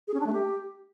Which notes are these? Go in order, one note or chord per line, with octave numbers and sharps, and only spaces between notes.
G#4
C#4
D4
A3
G4